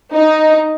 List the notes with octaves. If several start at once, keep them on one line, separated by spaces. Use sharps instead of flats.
D#4